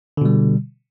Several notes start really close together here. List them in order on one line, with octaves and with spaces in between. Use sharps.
D3 B2 G3